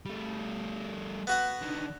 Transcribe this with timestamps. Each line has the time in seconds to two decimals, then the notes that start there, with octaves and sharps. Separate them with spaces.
0.06 G3 A3
1.27 B3 F#4 F#5
1.61 D3 D#3